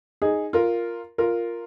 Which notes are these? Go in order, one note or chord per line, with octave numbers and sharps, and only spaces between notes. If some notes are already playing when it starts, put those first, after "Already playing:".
D#4 G#4
F4 A#4
F4 A#4